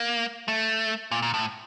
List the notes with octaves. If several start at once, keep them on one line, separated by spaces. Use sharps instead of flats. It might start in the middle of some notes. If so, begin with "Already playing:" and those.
Already playing: A#3
A3
A#2
A#2
A2